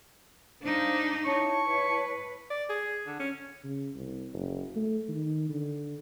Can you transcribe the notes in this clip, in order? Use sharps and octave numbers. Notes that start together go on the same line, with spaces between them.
D4 D#4 C5 F5
E4 C#5 A5 C#6
B4
D5
G#4
D3
C#4
C#3
C2
F#1
A3
D#3
D3